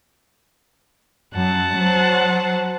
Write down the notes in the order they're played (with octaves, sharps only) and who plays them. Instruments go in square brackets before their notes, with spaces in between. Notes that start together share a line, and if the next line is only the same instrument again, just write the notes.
[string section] F#2 [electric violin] F#5 A5
[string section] F#3 C5